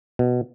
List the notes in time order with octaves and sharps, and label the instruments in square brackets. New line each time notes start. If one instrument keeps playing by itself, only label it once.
[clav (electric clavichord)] B2